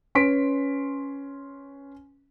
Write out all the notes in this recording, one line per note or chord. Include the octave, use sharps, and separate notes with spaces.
C#4 B4 C6 B6 D7